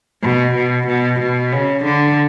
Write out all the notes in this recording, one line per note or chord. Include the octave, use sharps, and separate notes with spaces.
B2
B2
B2
B2
C#3
D3